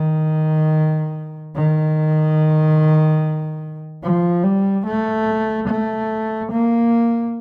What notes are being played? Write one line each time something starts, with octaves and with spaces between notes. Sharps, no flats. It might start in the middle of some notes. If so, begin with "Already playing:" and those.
Already playing: D#3
D#3
F3
G3
A3
A3
A#3